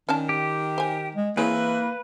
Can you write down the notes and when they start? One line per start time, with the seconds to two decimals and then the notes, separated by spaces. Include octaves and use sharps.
0.09 D#3 C#4 D4 A5
0.29 G4
0.78 C5 G#5
1.15 G#3
1.37 E3 A#3 C4 G#4 B4 C#5